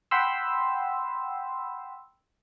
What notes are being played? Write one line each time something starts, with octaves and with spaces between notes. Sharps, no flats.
F#5 G5 B5 C6 E6